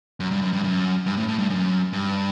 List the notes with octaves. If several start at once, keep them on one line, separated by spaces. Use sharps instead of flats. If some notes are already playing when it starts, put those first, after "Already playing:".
F#2
G2
F#2
G2
F#2
G2
A2
A2
G2
F#2
G2